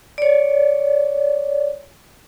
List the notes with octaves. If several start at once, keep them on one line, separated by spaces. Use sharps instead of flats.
C#5 D5